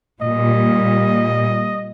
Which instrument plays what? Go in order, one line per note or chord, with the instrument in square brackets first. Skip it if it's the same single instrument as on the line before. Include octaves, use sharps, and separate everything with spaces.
[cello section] A#2 G3 [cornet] D#5